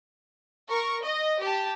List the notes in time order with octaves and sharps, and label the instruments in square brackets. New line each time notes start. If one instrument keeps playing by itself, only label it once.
[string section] A#4 C#6
D#5
G4 A5